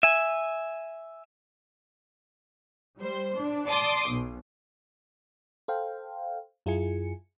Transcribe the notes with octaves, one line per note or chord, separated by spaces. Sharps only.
E5 G#5
G3 C5
D4
D5 A5 C6 D6 D#6
B1 B2
A4 C5 F5 G5
F#2 E4 F4 G#4 G#5 C#7